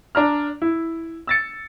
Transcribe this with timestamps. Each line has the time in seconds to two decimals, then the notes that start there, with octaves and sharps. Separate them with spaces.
0.15 D4 A#5 F6
0.62 E4
1.27 E6 A6 C#7